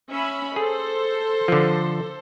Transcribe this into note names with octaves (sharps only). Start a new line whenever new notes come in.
C#4 E5 B5
G#4 A4 C5
D3 F3